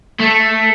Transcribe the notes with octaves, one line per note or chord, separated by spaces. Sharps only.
A3